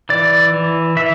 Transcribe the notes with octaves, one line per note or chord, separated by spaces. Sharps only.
E3 D5
E3
E3 E5